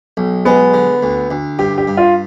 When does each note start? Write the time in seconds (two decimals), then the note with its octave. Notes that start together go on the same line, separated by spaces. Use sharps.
0.17 B1
0.45 G#3 B3
0.73 D3
1.03 D2
1.31 D2
1.59 G2 G4
1.78 G4
1.87 G2
1.97 F4